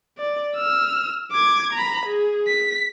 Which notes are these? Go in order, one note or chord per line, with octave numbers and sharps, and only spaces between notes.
D5
E6 F6
D6 G#6
A#5 B5
G#4
B6